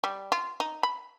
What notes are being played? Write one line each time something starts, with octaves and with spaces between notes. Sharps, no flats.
G3
F4
D#4
B5